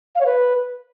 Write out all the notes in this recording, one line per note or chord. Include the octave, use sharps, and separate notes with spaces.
F5
C#5
B4